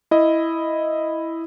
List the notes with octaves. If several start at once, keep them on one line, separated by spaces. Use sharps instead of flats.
E4 D#5